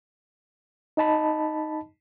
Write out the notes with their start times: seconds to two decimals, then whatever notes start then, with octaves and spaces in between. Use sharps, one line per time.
0.97 D#4 D#5 A5 B5